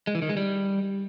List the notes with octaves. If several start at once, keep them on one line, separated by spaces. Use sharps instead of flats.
G#3
E3
D#3
G#3
G3